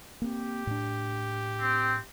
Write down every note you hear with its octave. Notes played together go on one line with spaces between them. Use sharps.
A#3 C4 G4
A2 D4
C4